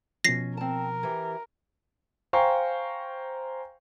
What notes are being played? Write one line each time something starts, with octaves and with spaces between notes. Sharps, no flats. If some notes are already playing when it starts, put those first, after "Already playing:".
B2 F3 C#4 A#6 C7
C4 A#4 A5
E3 G4
C5 F5 G5 G#5 A#5 C#6